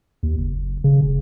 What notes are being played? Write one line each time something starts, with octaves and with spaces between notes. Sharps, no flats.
D#2
F#1
C#3
F1